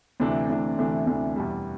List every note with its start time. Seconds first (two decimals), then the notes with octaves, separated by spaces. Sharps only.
0.20 D2 C3 E3 A3 D4
0.49 D2 C3 E3 A3 D4
0.78 D2 C3 E3 A3 D4
1.07 D2 C3 E3 A3 D4
1.36 E2 B2 G3